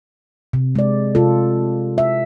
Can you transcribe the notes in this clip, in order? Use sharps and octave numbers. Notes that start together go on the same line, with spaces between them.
C3
G#3 D5
C3 F4 A4
E5